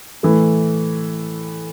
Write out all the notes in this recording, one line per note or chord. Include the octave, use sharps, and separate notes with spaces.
A2 E3 A3